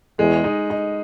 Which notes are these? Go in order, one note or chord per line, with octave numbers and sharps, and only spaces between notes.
E2 G#3
D#4
D#4